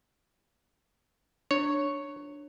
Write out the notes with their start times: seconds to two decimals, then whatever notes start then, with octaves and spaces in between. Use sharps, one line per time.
1.51 D4 C#5